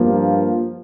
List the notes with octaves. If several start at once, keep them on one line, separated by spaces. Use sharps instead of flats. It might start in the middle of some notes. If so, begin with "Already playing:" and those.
Already playing: G2 F3 A#3